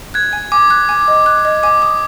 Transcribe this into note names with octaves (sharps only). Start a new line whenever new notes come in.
F#6 G#6
G#5
G#5 D6
F#6
G#5
D#5
F#6
D#5
G#5 D6
D#6